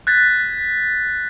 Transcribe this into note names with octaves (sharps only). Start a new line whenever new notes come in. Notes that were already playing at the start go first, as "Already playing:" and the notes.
F#6 G#6 A6 B6